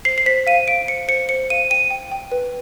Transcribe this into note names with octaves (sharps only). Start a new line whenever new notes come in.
C5 C7
C7
C5 B6
F5 D#7
F5 D7
C5 C#7
C5 C#7
C5 C#7
F5 D#7
G5 D#7
G5
G5
B4